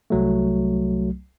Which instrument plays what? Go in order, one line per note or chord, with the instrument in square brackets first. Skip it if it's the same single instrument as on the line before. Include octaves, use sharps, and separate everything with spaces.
[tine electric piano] C2 F#3 A3